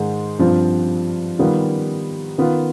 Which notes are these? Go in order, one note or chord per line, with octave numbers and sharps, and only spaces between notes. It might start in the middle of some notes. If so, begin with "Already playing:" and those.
Already playing: G#2 D#3 G#3
G2 F3 C4 F4
D#3 G3 B3 F4
D#3 B3 F4